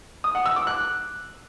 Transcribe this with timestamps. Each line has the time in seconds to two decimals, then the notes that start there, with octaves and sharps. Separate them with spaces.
0.24 D#6
0.35 F#5
0.46 E6
0.56 D6
0.67 F#6